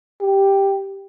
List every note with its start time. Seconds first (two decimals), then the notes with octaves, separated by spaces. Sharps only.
0.21 G4